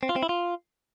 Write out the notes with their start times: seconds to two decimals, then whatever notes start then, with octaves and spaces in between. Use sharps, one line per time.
0.03 C4
0.09 F4
0.16 C4
0.23 E4
0.29 F4